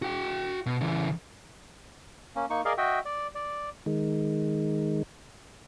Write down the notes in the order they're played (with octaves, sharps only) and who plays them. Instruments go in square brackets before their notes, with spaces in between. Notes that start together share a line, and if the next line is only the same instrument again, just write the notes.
[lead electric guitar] F#4 G5
B2
C#3 E3
[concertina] A#3 C#4
A#3 D#4 C#6
G#4 A#4 D5 D#5 F5
F#4 D#5 E5 G5
D5
D5
[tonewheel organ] D#3 G#3